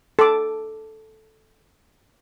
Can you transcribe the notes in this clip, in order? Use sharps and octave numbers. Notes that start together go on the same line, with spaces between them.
A4 D6